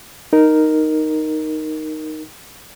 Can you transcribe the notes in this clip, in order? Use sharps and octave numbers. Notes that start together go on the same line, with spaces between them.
D#4 A#4